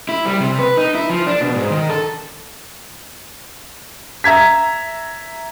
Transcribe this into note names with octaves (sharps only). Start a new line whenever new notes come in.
E4
G3
C3
B4
D#4
E4
F3
D4
B2
G#2
D#3
A4
E5 A#5 G#6 B6